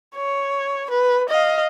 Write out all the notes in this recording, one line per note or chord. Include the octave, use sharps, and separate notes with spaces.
C#5
B4
D#5 F5